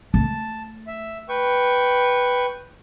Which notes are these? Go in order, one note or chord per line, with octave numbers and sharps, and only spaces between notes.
A3 A5
E5
B4 G5 C#6